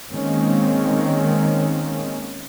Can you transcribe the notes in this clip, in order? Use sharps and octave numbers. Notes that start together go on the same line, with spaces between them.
D#3 G#3 A#3 C4 C#4